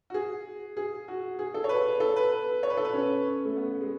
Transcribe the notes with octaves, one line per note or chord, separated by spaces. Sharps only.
F#4
G#4
G#4
F#4
G#4
A4
C#5
B4
A4
B4
B4
C#5
B4
A4
B4
C#4
A3
B3
G#3